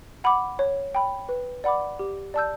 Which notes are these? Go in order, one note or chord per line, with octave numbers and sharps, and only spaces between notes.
F#5 B5 D6
C#5
G5 B5
B4
D5 F#5 B5 D6
G4
D5 A5 E6 G6